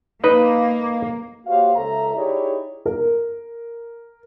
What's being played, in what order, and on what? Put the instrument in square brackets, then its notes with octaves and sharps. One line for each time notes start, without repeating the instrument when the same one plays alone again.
[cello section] A#3 [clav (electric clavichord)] D#4 B4 D#5
[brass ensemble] A#3 F#4 G4 C5 C#5 F5
C#2 A4 E5 A#5
D#4 E4 G4 G#4 C#5 D5
[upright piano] A#4